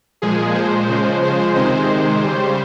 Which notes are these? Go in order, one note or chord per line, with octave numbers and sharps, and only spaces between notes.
A#2 F3 G#3 G#4
C5
C#3 F3 G#3
C5
C3 D#3 G#3 C5
C#3 G3